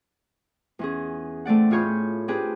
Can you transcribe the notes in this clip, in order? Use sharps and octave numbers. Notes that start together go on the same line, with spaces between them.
E2 C#4 G#4
A3 C4 D5 F#5
A2 F4 G#4 C#5 B5 G6
C4 D4 G4 G#4 B4